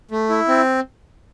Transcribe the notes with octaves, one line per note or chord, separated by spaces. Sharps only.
A3
E4
C4